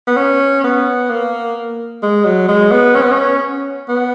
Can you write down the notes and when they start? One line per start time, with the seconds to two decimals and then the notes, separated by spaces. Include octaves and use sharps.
0.07 B3
0.16 C#4
0.64 B3
1.10 A#3
2.03 G#3
2.25 F#3
2.48 G#3
2.71 B3
2.95 C#4
3.02 B3
3.11 C#4
3.88 B3